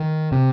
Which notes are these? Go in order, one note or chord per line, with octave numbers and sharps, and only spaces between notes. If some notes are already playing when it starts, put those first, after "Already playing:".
Already playing: D#3
C3